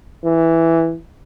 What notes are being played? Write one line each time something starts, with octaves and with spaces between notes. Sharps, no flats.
E3